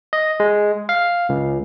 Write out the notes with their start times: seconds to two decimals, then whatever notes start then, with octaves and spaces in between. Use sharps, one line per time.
0.13 D#5
0.40 G#3
0.89 F5
1.29 C#2